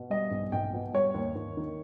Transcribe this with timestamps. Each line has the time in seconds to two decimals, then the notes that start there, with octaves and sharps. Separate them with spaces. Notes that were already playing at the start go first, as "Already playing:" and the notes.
Already playing: B2
0.10 G3 D#5
0.31 B1
0.52 B1 G5
0.73 B2
0.93 G3 C#5
1.14 D#2
1.35 D#2
1.57 D#3